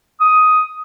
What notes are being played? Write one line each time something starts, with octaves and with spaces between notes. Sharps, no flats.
D#6